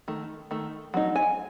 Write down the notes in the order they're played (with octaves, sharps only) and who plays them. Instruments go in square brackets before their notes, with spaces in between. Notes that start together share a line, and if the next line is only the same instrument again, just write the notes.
[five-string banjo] D#3 A3
D#3 A3
F#3 A3 D#4
G#5